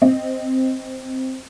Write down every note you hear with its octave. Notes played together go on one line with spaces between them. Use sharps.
C4 D#5